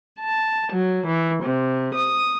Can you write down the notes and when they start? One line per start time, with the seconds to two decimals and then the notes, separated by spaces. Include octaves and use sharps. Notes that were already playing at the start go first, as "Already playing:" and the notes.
0.19 A5
0.71 F#3
1.06 E3
1.43 C3
1.93 D#6